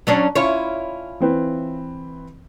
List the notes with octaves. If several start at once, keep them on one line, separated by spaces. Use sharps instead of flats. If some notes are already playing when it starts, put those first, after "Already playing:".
F#3 C#4 D4
C#4 E4 F4 C#5
E3 C4 B4